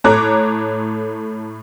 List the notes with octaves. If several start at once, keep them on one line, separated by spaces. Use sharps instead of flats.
A2 A4 C#5 A#5 D6 F#6